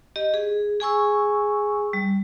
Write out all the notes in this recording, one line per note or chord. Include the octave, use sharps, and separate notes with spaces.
G4 D#5
G#4
G#4 G#5 C#6 E6
G3